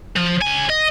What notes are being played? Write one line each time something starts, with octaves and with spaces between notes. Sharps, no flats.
F3
C#2 G#5
D#5